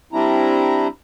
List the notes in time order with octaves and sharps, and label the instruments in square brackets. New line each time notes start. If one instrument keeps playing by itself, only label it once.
[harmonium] G3 C4 D4 E4 A#5